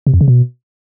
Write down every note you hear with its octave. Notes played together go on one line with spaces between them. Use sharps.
C3
F2
C#3
B2